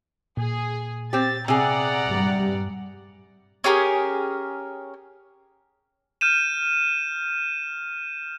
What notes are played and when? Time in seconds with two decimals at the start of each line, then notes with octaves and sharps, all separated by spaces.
0.37 A#2 G#4
1.13 C4 G4 A6
1.48 C3 G#4 D5 F#5 A#5
2.06 G2 G3
3.64 C#4 G4 G#4 A#4
6.21 F6 G6 D#7 E7